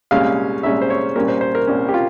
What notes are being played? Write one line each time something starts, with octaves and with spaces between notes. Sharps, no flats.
C2 A#2 G#3 C#4 F5
C2 A#2 G#3 C#4 E5
C5
C#5
C2 A#2 G3 A#3 C#4 A#4
C5
C5
A#4
C2 A#2 G3 A#3 C#4
G4
F4